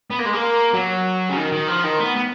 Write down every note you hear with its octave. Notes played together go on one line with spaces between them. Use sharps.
B3
A#3
G#3
A#3
F#3
C#3
D#3
D#3
F3
D#3
B3
B3